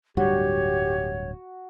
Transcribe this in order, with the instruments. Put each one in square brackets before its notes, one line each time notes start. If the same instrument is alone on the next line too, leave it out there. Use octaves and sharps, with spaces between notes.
[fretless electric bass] D1 G2 G3 [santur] F#4 [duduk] G4 [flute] C#5